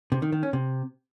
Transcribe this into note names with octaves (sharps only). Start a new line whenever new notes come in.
C3
D#3
D#3
C#4
C3